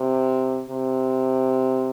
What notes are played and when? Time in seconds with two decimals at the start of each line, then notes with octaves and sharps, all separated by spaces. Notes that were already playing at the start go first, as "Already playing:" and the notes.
Already playing: C3
0.70 C3